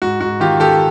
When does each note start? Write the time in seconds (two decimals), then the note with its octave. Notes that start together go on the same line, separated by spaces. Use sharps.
0.02 G#2 F#4
0.20 G#2 F#4
0.40 D#3 F4 G4
0.60 D#3 G4 A4